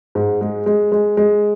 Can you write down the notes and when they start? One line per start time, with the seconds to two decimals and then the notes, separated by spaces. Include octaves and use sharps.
0.15 G#2
0.41 G#3
0.66 G#3
0.92 G#3
1.17 G#3